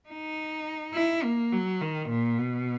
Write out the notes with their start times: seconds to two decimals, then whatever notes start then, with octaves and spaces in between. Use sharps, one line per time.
0.09 D#4
0.94 E4
1.24 A#3
1.52 F#3
1.81 D#3
2.09 A#2
2.38 B2